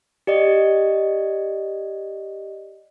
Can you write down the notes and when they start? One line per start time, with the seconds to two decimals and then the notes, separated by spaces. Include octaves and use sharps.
0.27 G4 D5 D#5